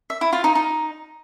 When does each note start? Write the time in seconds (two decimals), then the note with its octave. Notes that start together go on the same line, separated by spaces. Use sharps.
0.10 E5
0.21 E4
0.33 F4
0.44 D#4
0.55 D#4